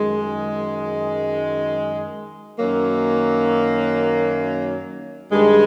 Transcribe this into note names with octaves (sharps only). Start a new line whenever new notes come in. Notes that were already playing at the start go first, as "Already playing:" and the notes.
Already playing: F#2 D#3 G#3
F#2 D#3 F#3 A#3
G2 D#3 G#3